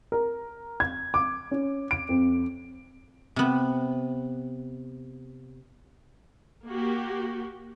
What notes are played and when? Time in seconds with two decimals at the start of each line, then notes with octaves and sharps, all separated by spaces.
0.12 A#4
0.80 G#6
1.14 D6
1.51 C#4
1.91 D7
2.09 F2
3.36 C3 B3
6.66 A#3 F#4 G4